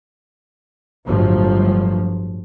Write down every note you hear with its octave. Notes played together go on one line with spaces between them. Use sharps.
G1 A2 F3 F#3